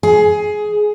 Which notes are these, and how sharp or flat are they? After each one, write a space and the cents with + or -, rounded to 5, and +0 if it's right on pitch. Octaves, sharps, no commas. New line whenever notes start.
G#4 +15